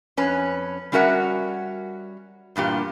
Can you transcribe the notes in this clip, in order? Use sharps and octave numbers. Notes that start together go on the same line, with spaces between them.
F2 C#4 B4
G3 C#4 F#4 A#4 E5 F#5
E2 G2 A#2 G4